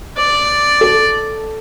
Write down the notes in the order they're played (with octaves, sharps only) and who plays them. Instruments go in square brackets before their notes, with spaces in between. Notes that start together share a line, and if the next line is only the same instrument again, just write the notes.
[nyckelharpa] D5
[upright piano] A4